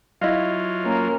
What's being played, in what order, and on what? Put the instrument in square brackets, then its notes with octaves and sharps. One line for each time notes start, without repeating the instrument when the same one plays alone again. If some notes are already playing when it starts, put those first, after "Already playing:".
[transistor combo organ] F#3 F4 [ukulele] E4 D#5 F5
[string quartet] A#3 C#4 A#4